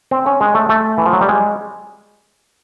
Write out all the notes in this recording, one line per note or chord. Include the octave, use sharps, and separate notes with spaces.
C4
C#4
G#3
A3
A3
E3
F3
F#3
G3
G#3